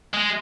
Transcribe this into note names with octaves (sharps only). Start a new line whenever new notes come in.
G#3